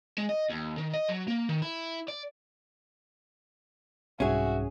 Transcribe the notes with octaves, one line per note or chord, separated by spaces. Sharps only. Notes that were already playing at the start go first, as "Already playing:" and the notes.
G#3
D#5
D#2
D#3
D#5
F#3
A#3
D#3
E4
D5
C2 G#2 C#4 F#4 G#4 E5